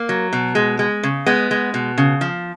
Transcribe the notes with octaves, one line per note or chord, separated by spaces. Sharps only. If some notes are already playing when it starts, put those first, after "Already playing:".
Already playing: A#3
F#3
B2
G#3
G#3
C#3
G#3 B3
G#3
B2
C#3
F3